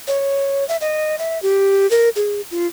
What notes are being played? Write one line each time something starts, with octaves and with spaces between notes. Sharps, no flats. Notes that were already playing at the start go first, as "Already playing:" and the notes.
C#5
E5
D#5
E5
G4
A#4
G#4
F4